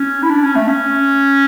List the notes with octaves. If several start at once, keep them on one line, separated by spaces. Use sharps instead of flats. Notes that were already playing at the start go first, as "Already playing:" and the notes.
Already playing: C#4
E4
D4
C#4
A3
C#4